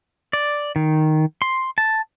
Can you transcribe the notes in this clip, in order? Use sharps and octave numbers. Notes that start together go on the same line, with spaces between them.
D5
D#3
C6
A5